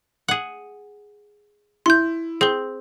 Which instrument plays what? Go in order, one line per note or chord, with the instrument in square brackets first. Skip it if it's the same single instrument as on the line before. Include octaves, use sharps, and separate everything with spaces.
[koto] G#4 F#5
[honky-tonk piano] E4 [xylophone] C6 G6
[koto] C4 [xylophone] G#4 G7